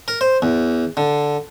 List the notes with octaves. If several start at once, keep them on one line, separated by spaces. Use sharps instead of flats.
A#4
C5
E2
D3